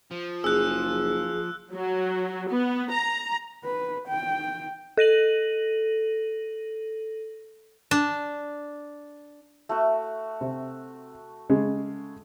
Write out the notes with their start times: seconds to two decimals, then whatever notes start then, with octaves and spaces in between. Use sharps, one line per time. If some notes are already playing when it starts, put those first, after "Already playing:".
0.12 F3
0.44 F#1 G#4 E6 F#6
1.73 F#3
2.50 B3
2.92 A#5
3.64 B4
4.08 G5
4.97 A4 A#6 D#7 F#7
7.91 D4
9.69 A3 F#4 C#6
10.41 C3
11.50 C#3 G#3